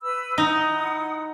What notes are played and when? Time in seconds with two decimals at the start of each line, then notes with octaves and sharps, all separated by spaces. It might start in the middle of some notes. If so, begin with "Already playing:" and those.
0.01 B4 B5 E6
0.38 D#4 E4 F#5 D#6